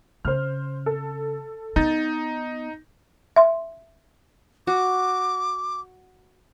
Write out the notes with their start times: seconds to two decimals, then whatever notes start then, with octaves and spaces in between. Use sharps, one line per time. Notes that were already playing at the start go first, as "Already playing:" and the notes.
0.25 C#3 C5 F6
0.86 A4
1.76 B3 D#4 G6 A6
3.36 E5 C6
4.67 F#4 D6